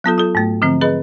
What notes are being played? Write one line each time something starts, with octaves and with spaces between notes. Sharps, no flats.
F#3 B3 F4 A4
F4 A4
G#2 A3
D3 F3 C4
G#4 B4 D#5 B5